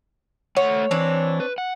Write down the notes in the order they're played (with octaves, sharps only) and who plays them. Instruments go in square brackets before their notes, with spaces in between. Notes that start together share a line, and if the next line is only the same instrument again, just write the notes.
[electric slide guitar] A3 F#5 [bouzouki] C#5
[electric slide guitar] E3 [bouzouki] C4 D4 C#5
[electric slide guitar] B4
F#5